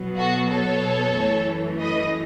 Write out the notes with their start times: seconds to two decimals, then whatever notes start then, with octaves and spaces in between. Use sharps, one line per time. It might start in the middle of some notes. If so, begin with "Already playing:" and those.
Already playing: B2 F#3 B3
0.17 F#4 A4
0.50 A4 C#5
1.15 F#2 E3 A3
1.80 B4 D#5